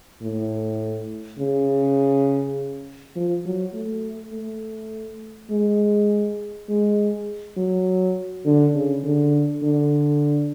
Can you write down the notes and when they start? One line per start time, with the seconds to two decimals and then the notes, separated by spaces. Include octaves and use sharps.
0.22 A2
1.39 C#3
3.16 F3
3.45 F#3
3.74 A3
4.33 A3
5.51 G#3
6.69 G#3
7.57 F#3
8.45 D3
8.74 C#3
9.04 D3
9.63 D3